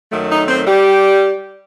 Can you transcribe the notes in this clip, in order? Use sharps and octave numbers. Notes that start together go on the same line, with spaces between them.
F#2 D#3 F#3 A3
D#4 D#5
C4 C5
G3 G4